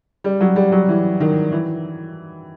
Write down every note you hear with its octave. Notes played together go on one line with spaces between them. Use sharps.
G3
F#3
G3
F#3
E3
D#3
E3